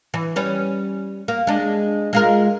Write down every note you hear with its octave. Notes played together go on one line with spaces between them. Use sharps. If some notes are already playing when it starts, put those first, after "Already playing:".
E3
G3 C#4 B4
A#3
G#3 D4
G#3 F4 A#4